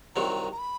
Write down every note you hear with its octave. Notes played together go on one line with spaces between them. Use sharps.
C2 C3 D#3 F#3 A#5
A#5
B5